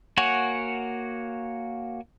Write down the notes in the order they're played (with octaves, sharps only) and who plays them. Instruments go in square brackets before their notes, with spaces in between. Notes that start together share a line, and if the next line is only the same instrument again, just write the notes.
[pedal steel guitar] A#3 F#4 C#5 F#5 G#5